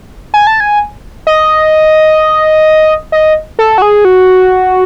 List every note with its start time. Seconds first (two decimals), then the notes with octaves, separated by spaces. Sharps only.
0.34 G#5
0.47 A5
0.60 G#5
1.27 D#5
3.12 D#5
3.59 A4
3.78 F#4
3.82 G#4
4.05 F#4